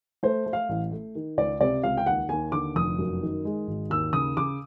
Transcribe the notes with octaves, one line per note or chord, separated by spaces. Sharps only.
A3 C5
A3
F5
A1
A3
D#3
C#2 D5
C3 D5
C#2 F5
G5
D#2 F#5
D#2 G#5
D3 D6
F1 D#6
F#2
D#3
G#3
G#1
D#2 E6
C#3 D#6
C#3 D6